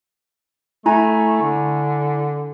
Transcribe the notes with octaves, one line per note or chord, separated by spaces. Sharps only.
A3 E4 G#5 A#5
D3